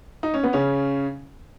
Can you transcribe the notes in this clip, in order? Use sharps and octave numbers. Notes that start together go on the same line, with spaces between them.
D#4
C#4
B3
C#3 C#4